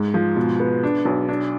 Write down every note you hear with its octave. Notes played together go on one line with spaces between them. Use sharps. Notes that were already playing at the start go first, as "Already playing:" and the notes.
Already playing: G#2
F3
B2
B3
D4
B1
D4